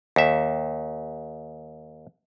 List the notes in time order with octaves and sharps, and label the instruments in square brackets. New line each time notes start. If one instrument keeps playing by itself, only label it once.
[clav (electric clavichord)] D#2 E5